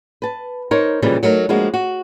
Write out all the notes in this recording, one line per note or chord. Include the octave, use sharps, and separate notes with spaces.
B4 A5
D#4 A#4 C5 C#5
A#2 C#3 E3 F3 G3
F#3 A3 D#4 A#4
F3 G3 G#3 A#3 D4 F#4
F#4